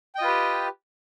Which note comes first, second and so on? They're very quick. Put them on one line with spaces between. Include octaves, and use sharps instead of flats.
G5 D#5 F4 B4 G4